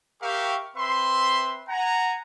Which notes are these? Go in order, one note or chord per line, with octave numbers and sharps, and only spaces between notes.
G4 A#4 E5 F5 G5 C#6
C4 B4 E5 C6
F#5 G#5 A#5